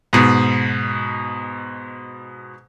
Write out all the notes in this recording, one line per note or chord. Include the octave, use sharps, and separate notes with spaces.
G#2 B2